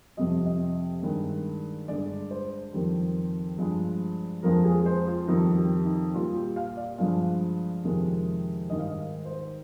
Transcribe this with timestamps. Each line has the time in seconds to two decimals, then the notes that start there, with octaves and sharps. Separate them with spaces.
0.17 F2 C3 G3 D#5
0.45 D#5
1.03 G2 D#3 G#3
1.88 G2 D3 G#3 D5
2.31 C5
2.72 F2 D#3 G3
3.58 G2 F3 G#3
4.43 F2 D3 F3 G#3 A#4
4.65 G#4
4.86 C5
5.07 F4
5.28 F2 D#3 G3 D#4
5.57 G4
5.85 D#4
6.14 A#2 G3 F4
6.35 G4
6.56 F5
6.77 D5
6.98 G2 D3 F3 G#3 F5
7.85 F2 C3 D#3 G#3
8.69 G#2 D#3 G3 D#5
8.79 F5
8.87 D#5
9.25 C5